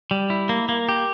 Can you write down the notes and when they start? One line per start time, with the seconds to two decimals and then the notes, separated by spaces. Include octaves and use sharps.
0.11 G3
0.30 E4
0.49 A#3
0.69 A#3
0.89 G4